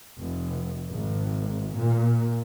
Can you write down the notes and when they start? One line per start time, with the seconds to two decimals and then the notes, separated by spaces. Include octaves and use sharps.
0.19 F1
0.92 G#1
1.77 A#2